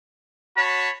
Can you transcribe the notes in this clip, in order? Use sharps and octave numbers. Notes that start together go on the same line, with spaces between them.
F#4 C#5 A5 B5